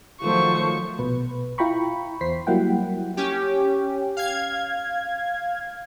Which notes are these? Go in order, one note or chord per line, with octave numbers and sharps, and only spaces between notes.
D#3 F3 F#3 A3 C5 C#6
A#1 B2 B4
E4 F4 G5 A#5 B5 C#6
E2 C5 B6 C7
F#3 G3 A#3 E4 F#5 G5
C#4 G4
F5 G#6